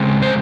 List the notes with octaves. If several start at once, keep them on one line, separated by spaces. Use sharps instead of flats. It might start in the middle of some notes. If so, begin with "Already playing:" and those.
Already playing: C#3 G#3 C4
C5